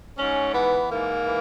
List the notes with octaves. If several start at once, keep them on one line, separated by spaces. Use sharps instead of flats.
G#2 C#4
E3 B3
G#2 A#3
E3